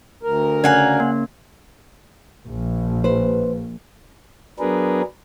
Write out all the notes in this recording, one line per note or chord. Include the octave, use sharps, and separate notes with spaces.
D2 A#4
C#3 D5 F5 F#5 G#5 G#6
A#3
A#1
B4 C5
F#3 B3 D4 G#4 A#4 B4